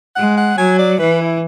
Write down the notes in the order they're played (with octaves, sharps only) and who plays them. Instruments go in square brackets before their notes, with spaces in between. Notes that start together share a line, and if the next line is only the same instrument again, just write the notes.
[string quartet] G#3 [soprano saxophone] F#5
[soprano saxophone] F#5
[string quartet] F#3 [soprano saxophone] G#5
[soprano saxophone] D5
[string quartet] E3 [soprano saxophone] B4
[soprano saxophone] E4